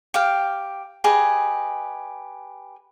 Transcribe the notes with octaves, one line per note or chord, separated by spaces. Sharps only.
G4 F5 G5
G4 G#4 B4 D#5